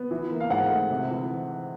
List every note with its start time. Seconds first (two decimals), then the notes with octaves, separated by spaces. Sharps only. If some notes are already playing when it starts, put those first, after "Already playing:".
Already playing: B3
0.11 E3
0.31 A#3
0.40 F5
0.50 G#2 F#5
0.71 A3
0.89 C3
1.10 E3